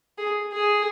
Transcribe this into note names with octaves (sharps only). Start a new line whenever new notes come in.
G#4
G#4